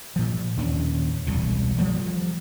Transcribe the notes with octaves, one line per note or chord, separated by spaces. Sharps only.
A#2 F3
D#2 A#2 C#4 D4
E1 C2 A#2
F3 G3 A3